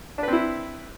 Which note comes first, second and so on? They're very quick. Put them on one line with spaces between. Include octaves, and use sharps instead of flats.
D4 B4 C4 E4